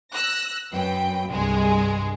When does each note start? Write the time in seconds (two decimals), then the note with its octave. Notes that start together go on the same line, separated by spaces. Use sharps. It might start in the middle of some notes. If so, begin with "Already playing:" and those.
0.13 E6 F#6 A#6
0.73 F#2 B4 G5
1.31 C2 G2 G#3 G#4